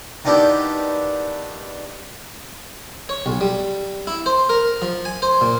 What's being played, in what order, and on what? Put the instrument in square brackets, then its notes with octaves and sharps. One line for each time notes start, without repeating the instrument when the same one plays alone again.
[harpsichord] D#3 B3 D4 E4 G4
C#5
B1
G3
E4
C5
A#4
F3
G#5
C5
A#2